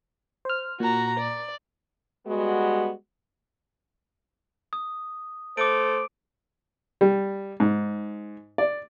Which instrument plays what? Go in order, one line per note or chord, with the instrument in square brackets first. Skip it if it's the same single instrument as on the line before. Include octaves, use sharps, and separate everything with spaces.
[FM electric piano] C5 F6
[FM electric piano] A#2 [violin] F#4 A#5
[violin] D5
[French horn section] G3 G#3 B3 F#4
[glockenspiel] D#6
[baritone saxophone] A3 [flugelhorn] C5 [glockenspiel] D6 D7
[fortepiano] G3
G#2
D5